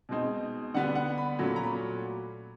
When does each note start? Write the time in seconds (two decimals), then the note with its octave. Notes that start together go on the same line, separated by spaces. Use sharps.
0.09 B2 G#3 C4 D#4
0.74 D3 G3 B3 F#5
0.95 F#5
1.18 B5
1.39 A#2 F#3 A3 C#4
1.47 B5
1.56 A#5
1.63 B5